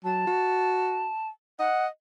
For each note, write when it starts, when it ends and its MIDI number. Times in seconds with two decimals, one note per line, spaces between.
0.04 0.22 54
0.04 1.28 81
0.27 1.09 66
1.59 1.88 75
1.59 1.85 78